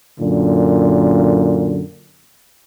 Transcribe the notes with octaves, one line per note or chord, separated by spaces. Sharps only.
F#2 A#2 D3